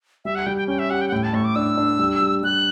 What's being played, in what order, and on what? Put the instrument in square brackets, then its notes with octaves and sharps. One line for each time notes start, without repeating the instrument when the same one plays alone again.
[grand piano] G3 [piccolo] E5
[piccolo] F#5
[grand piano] G3 [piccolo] G5
[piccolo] G5
[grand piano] C#4 [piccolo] G5
[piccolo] E5
[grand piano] G4 [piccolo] F#5
[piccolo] G5
F#5
[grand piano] A2 [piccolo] G5
[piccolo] A5
[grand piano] A2 [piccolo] C#6
[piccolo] D6
[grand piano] D4 [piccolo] E6
[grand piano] D4
G3
G3
[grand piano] G3 [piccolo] F#6